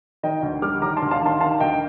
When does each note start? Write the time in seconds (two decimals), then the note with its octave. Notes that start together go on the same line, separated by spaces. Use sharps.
0.23 D#3 D#5 G5
0.43 D2
0.62 G3 D6 F6
0.82 D#3 A#5 D6
0.96 A5 C6
1.02 D2
1.11 F5 A5
1.22 D#3 A5 C6
1.40 D#3 F5 A5
1.60 D2 D#5 G5